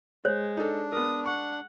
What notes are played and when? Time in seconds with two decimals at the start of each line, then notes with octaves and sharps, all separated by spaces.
0.25 G#3 C5 C#5
0.57 D4 D#4 A4
0.92 B3 A#4 D#6
1.26 F#5 C#6